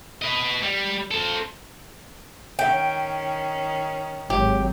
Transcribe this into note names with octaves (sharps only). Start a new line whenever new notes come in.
B4 D#5
G3
A4 C5
D#3 C#4 G5
G#1 F#3 G4